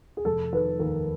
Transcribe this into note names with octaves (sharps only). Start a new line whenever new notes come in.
G#4
F1 A4
D#3 B4
D#2 A#4